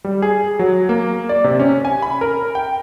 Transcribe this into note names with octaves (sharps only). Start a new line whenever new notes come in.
G3
G#4
F#3
A#3
D5
C3
C#4
G#5
B5
A#4
G5